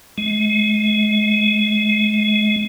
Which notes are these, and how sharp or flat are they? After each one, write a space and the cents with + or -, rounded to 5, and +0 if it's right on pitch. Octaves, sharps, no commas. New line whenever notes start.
G#3 +35